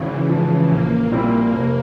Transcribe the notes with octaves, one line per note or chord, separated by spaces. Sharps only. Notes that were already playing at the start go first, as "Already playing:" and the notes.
Already playing: G#1 C#3 E3
G#2 F3
A#1 A#3
A#2 G3 C4 E4
F1